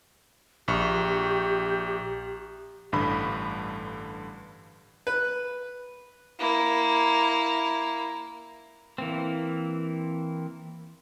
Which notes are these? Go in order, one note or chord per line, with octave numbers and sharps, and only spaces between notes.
A#1 G4 C#6
A1 G2 D3 B5
B4
A#3 E4
E3 A#3 C4